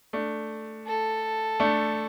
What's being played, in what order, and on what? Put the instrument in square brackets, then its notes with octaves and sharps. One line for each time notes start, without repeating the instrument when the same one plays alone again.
[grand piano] A3 D4
[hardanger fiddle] A4
[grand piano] A3 D4